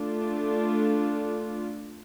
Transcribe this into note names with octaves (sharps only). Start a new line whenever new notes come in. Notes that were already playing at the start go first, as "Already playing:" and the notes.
Already playing: A3 D4 F4